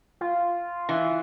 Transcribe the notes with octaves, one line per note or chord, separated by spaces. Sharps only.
F4
E3